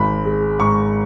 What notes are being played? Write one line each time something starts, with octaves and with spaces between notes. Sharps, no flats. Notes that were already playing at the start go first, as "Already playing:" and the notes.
Already playing: G#1 B5
G#3
G#2 C#6